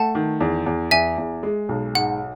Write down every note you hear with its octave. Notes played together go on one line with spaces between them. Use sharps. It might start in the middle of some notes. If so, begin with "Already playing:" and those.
Already playing: A3 F#5 A5
D#3
E2
E2
E2 E5 G#5
E2
G#3
B1
G#2 F#5